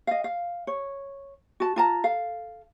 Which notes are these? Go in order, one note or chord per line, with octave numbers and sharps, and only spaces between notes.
D#5 F5
F5
C#5
F#4 A5
F4 A5 A#5
A4 F5